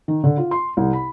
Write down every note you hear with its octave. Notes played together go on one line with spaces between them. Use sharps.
D#3
D3
F4
C6
C2
B5